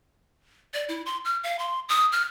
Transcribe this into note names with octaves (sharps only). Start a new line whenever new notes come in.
D5
E4
C6
F6
F5
C6
D#6
F6